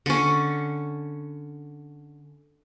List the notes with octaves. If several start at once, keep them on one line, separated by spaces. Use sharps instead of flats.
D3 C#4